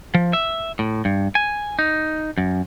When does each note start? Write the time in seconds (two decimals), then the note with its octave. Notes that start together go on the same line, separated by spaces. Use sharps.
0.14 F3
0.33 E5
0.79 A2
1.05 G2
1.35 G#5
1.79 D#4
2.38 F#2